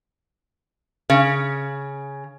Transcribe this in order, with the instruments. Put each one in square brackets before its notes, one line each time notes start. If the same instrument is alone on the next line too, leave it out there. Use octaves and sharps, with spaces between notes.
[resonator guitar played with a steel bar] C#3